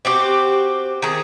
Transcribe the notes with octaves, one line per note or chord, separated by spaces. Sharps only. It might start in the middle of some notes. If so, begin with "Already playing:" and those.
C4 F#4 G4
D#3 G#4